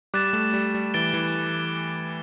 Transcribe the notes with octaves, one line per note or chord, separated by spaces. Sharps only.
G3 D6 F#6 A6 E7
A3
G3
G3
E3 A6 D7 G7
E3